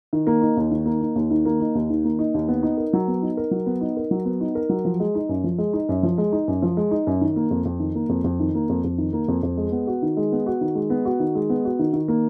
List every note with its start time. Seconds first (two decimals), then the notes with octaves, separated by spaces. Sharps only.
0.13 D#3
0.27 A#3
0.41 D#4
0.57 D#2
0.71 D#3
0.86 A#3
1.01 D#4
1.16 D#2
1.30 D#3
1.45 A#3
1.60 D#4
1.75 D#2
1.90 D#3
2.05 A#3
2.19 D#4
2.34 D#2
2.48 B3
2.63 D#4
2.77 A#4
2.93 F#3
3.08 B3
3.22 D#4
3.37 A#4
3.51 F#3
3.66 B3
3.81 D#4
3.97 A#4
4.11 F#3
4.25 B3
4.40 D#4
4.55 A#4
4.69 F#3
4.85 F3
5.00 G#3
5.15 D#4
5.29 F#2
5.44 F3
5.58 G#3
5.73 D#4
5.89 F#2
6.03 F3
6.18 G#3
6.32 D#4
6.48 F#2
6.62 F3
6.77 G#3
6.91 D#4
7.07 F#2
7.21 D#3
7.36 A#3
7.51 F2
7.65 F2
7.80 D#3
7.95 A#3
8.09 F2
8.24 F2
8.40 D#3
8.55 A#3
8.69 F2
8.84 F2
8.98 D#3
9.13 A#3
9.28 F2
9.43 F2
9.57 G#3
9.72 B3
9.87 F#4
10.02 D#3
10.17 G#3
10.32 B3
10.46 F#4
10.61 D#3
10.75 G#3
10.90 B3
11.05 F#4
11.20 D#3
11.35 G#3
11.50 B3
11.65 F#4
11.79 D#3
11.93 D#3
12.08 A#3